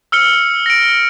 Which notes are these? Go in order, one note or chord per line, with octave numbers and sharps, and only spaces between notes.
E6 F6 C#7 G7
A#6 D7